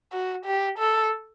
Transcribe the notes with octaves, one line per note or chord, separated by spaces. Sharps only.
F#4
G4
A4